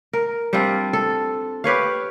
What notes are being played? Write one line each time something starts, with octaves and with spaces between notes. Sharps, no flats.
A#4
G3 C4 D4 F4
A4
G4 B4 C#5 F5